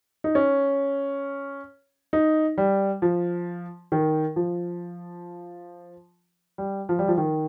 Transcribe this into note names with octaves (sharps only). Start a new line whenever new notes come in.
D#4
C#4
D#4
G3
F3
D#3
F3
G3
F3
G3
F3
D#3